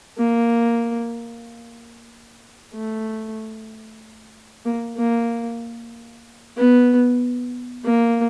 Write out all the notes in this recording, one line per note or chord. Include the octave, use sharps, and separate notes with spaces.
A#3
A3
A#3
A#3
B3
A#3